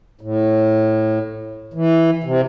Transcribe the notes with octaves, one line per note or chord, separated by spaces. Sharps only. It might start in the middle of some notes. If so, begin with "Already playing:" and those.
A2
E3
C3